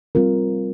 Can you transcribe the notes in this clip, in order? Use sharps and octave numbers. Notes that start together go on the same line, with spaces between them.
G3 C4 F4 A#4